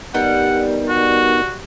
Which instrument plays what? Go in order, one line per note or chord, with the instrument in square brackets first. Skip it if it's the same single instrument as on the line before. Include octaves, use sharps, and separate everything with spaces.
[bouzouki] G3 [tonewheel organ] B3 D#4 A#4 [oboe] F#5
[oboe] F#4